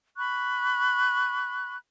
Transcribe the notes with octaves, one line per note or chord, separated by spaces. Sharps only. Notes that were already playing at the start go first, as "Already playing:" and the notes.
B5 C#6 F#6